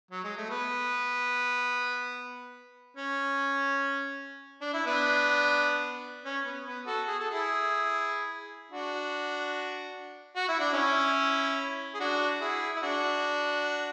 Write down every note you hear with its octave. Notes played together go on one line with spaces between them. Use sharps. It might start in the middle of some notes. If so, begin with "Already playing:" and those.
F#3
G#3
A3
B3
C#4
D4
E4
B3 D4
C#4
B3
B3
F#4 A4
G#4
A4
E4 G#4
D4 F#4
F#4
E4
D4
C#4 E4
G#4
D4 F#4
E4 G#4
E4
D4 F#4